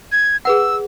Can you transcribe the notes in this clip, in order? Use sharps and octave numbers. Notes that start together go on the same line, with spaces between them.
G#6
G#4 B4 F#5 E6